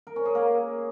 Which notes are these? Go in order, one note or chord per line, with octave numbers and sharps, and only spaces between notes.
A#4
C#4
G#4
A#3